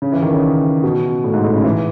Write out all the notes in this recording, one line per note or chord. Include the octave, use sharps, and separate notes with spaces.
C#3
E3
D#3
C#3
B2
A2
G#2
A2
C#3
E3